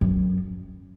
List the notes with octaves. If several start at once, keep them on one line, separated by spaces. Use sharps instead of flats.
F#2